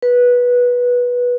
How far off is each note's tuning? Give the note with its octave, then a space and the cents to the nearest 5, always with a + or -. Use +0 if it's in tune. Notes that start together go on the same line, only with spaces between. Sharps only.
B4 -15